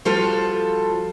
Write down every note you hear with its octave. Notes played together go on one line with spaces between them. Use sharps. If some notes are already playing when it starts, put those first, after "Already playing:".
F3 G3 F4 F#4 A4